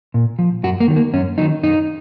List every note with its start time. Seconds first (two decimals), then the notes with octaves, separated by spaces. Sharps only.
0.14 A#2
0.39 F3
0.63 F#2 F#4
0.80 A#3
0.88 D#3 F#3
0.96 A#3
1.13 F#2 C#4
1.38 D#3 F#3 D#4
1.63 F#2 D#4